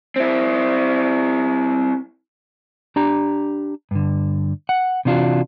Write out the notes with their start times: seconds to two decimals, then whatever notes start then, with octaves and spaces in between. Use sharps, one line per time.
0.16 C4 E4
2.96 D4 G4 A#5
3.91 G2 D3
4.69 F#5
5.05 C3 E3 D4 F4 F#4